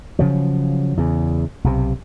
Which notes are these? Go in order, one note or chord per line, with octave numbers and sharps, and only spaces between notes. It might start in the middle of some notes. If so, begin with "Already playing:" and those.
C#3 F3 F#3
E2 C#3
B1 C3